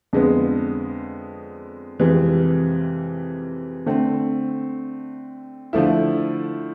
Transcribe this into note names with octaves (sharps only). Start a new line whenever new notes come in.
F2 D3 G#3 B3
F2 C3 E3 G#3
D3 A3 C4
D3 F3 A3 E4